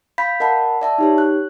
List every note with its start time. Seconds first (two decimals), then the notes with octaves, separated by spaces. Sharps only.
0.18 F5 B5 G6 B6
0.40 A#4 D#5 F#5 A5 B5
0.81 D5 E5 A5
0.98 D#4 G4 C#5
1.18 F#6